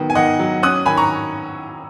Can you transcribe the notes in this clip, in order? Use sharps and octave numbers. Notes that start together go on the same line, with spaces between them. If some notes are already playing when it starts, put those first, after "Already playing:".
Already playing: D#3 F#3 B3
G#5
D#3 D#5 F#5
F#3
C#4 D#6 F#6
D#3 G#5 B5
A#5 C#6